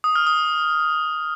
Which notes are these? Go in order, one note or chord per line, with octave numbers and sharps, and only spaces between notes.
D#6
F6
D#6